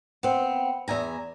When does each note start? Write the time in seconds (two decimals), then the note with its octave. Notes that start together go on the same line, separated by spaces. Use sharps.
0.23 B3 C4
0.88 E2 E5 G#5 A#5